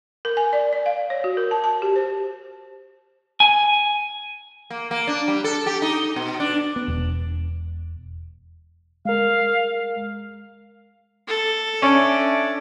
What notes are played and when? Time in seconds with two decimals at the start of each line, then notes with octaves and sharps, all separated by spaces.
0.25 A#4
0.37 G#5
0.53 D5
0.73 D5
0.86 F5
1.10 C#5
1.24 F#4
1.37 A#4
1.51 A5
1.64 A5
1.82 G4
1.96 C5
3.40 G#5
4.70 A#3
4.91 A#3
5.07 D4
5.28 G3
5.44 A4
5.66 G4
5.82 D#4
6.16 B2
6.40 D4
6.76 B3
6.88 E1
9.05 G#3 A#4 F5
11.27 A4
11.82 C#4 D4 D5 E5